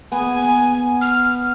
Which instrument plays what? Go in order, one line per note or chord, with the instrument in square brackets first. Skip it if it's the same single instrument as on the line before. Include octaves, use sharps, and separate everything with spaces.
[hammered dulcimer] B3 [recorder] G#5
[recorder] F6